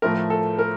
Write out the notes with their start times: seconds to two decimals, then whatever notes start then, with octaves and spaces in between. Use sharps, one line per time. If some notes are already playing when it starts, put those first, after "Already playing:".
0.02 A2 F3 A3 A#4
0.30 A4
0.58 A#4